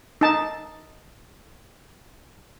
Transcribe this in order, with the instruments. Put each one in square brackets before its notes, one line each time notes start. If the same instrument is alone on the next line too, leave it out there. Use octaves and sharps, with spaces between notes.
[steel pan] D#4 A5